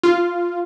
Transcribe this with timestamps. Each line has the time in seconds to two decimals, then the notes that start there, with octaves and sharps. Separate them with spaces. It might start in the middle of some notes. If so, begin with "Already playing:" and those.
0.04 F4